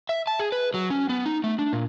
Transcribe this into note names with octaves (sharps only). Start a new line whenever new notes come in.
E5
A5
G#4
B4
F#3
C#4
B3
D#4
A3
D4
A#2